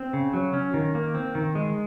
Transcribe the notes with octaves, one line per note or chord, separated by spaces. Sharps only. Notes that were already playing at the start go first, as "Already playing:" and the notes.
Already playing: C4
C#3
F#3
C#4
D#3
A#3
C4
D#3
G#3